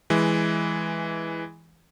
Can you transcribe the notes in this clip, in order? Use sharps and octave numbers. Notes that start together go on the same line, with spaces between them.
E3 G#3